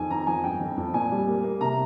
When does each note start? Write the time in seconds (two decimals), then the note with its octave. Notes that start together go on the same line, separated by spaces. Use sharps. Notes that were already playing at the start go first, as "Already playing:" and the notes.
Already playing: F2 D#3 G#5
0.11 F2 A#5
0.27 F3 G#5
0.44 G2 G5
0.61 F2
0.77 F2
0.94 A#2 G#5
1.11 G3
1.27 A#3
1.44 A#3
1.61 C3 A#5